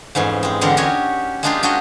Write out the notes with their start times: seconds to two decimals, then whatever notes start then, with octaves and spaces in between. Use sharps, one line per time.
0.15 F2 G#2 E3 C#4
0.43 G#3 C4
0.61 E2 D3 C4 G4 A#4 F#5
0.77 C#4 F#4 G4 C#5 D#5
1.43 G#3 A#3 D4 D#4 F4 G4
1.63 C#4 D4 F#4 G4 D#5